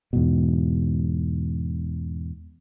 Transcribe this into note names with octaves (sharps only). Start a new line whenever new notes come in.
E2 G#2 B2